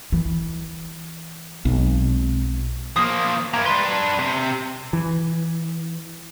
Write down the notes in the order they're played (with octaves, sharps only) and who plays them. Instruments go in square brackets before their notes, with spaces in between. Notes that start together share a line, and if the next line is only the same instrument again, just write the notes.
[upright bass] E3
[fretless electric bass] B1 [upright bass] G#3 C4
[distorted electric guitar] F3 A#3 [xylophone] D#6 C7
[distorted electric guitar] A#3 E4 [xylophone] A#5 G#6
[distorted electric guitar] D4 B4 [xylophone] C6
[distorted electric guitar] C3
[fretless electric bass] E3